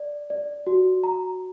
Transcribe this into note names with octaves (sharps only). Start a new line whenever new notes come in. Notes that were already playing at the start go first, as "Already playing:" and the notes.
Already playing: D5
D5
F#4
A#5